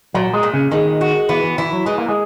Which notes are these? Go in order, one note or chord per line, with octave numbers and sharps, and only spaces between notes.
A#2 F#3
G#3
A#2
C#3
D#3 G#3
F#4
E3 B3
E3
E3 E4
F#3
E3 G#3
A#3
G#3